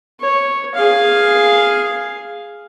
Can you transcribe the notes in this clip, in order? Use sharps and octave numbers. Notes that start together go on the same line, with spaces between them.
C#5
G#4 F5